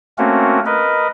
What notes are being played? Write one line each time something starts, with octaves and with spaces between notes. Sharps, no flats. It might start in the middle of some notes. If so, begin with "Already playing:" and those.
A3 A#3 C4 C#4 F#4 A#4
A#4 B4 D#5